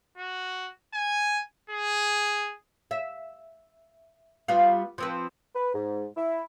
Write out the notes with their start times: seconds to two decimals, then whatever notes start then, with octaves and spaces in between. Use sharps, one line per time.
0.18 F#4
0.94 G#5
1.70 G#4
2.91 E5
4.48 G3 B3 F4
4.98 F3 C4 B4
5.55 B4
5.74 G#2
6.17 E4